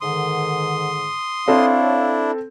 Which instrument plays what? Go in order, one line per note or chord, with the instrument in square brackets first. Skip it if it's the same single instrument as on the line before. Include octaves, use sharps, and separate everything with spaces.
[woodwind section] G#2 D3 D#3 [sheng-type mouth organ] C6 D#6
[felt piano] C4 A4 [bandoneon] D4 E4 [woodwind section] C#5 F5